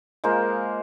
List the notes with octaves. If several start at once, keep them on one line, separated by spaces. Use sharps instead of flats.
G#3 A#3 F4 C5